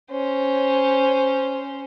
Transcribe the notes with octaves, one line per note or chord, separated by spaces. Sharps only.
C#4 C5